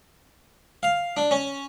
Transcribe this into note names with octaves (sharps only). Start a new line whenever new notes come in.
F5
D4
C#4